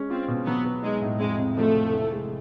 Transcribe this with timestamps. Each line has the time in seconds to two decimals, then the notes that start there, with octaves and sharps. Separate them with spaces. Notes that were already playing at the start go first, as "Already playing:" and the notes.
Already playing: G#3 C#4
0.10 C4 F4
0.28 B2
0.46 F#3 B3
0.64 B3
0.83 G#3 D#4
1.01 A2
1.20 F2 G#3
1.39 C3
1.57 F3 A3
1.75 F1
1.93 E3
2.11 G#3